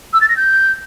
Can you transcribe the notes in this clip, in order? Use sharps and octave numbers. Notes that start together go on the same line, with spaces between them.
E6
A6
A#6
G6